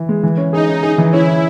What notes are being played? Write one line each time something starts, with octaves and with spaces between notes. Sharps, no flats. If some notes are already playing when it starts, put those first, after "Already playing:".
Already playing: E3
G#3
E3
C#4
D#4 G#4
C#4
D#4 G#4
E3
C#4 E4
C#4